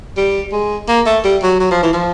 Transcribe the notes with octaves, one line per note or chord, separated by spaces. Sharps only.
G3
G#3
A#3
A3
G3
F#3
F#3
F3
E3
F3